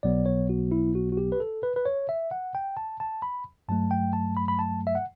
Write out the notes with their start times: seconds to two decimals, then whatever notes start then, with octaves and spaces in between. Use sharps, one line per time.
0.03 B1 B2 F#3 B3 D5
0.26 C#5
0.49 F#4
0.72 E4
0.95 F#4
1.12 F#4
1.17 G4
1.32 B4
1.40 A4
1.63 B4
1.76 B4
1.85 C#5
2.09 E5
2.31 F#5
2.55 G5
2.77 A5
3.00 A5
3.22 B5
3.68 G2 F#3 A3 A5
3.91 G5
4.13 A5
4.37 B5
4.48 B5
4.59 A5
4.87 E5
4.95 F#5